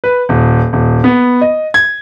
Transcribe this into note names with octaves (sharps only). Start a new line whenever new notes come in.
B4
D#1
D#1
B3
D#5
G#6